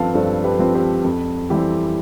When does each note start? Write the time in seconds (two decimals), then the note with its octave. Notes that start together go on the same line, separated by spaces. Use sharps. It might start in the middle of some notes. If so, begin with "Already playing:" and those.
Already playing: G2 F3 C4 A4 B4 F5 A5
0.14 G2 A4 C5
0.44 G4 B4
0.59 F3 C4
0.75 G4 B4
1.04 F2
1.50 E3 G3 C4 E4 G4